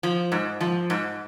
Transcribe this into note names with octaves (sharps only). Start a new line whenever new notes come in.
F3
G#2
F3
G#2